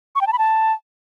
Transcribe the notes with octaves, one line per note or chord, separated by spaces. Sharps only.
C#6
G5
A5
B5
A5